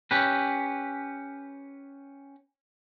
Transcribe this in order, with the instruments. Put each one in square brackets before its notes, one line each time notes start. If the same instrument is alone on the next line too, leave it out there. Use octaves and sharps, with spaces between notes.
[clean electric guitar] C#4 G4 B4